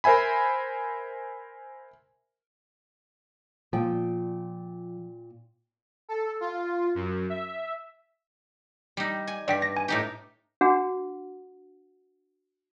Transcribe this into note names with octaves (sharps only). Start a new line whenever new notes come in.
A#4 C5 E5 G#5 B5
A#2 F3 G5
A4
F4
F#2
E5
G3 D#4
G#5
G2 D5 G5 B6
A#6
G#5
A2 D#4 G4
D4 F#4 G#4 F#5